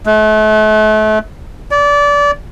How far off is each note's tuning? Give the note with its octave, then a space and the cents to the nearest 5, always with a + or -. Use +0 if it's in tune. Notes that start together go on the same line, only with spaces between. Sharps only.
A3 -35
D5 -25